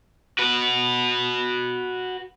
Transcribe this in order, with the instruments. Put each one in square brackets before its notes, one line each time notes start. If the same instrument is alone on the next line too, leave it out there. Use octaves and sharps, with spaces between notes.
[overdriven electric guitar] F#4 B4